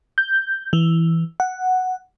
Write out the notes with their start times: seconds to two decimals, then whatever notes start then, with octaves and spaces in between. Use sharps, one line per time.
0.18 G6
0.73 E3
1.40 F#5